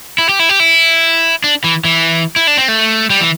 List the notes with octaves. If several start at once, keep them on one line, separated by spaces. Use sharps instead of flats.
E4
G4
E4
G4
E4
D4
E3
E3
E4
D4
C4
A3
G3
E3